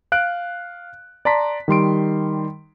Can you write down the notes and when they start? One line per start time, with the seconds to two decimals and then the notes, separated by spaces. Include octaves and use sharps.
0.12 F5 F#6 D7
1.25 D5 A5 A#5 C6 B6
1.68 D#3 G3 C6 D7